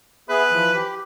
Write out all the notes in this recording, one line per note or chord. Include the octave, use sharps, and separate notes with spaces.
B3 G#4 B4 E5
E3 F3
G4